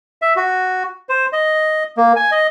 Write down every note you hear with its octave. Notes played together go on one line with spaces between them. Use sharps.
E5
F#4
C5
D#5
A#3
G#5
D#5